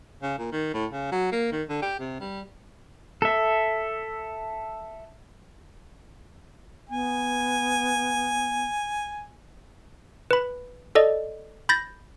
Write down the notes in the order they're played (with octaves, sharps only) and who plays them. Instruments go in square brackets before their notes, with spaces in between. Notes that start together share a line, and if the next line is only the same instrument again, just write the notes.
[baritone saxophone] C#3
A#2
D#3
A2
C#3
F#3
A#3
D#3
D3
G4
C3
G3
[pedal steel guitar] A4 E5
[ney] B3 [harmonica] G#5
[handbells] B4 B5
A4 D5 D#5
B5 G6 A6 A#6